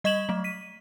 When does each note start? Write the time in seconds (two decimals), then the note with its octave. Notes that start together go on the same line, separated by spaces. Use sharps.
0.04 G3 D#5 C#6 G#6 E7 F#7
0.29 F#3 A3
0.44 B6 D#7